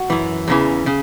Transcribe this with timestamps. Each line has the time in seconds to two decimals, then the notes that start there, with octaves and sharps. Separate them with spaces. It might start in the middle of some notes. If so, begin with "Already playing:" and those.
Already playing: F#4
0.10 F#2 E3
0.48 E2 C#3 E3
0.86 C#3